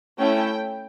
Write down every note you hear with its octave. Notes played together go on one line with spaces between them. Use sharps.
A3 C#4 E4 A4 G5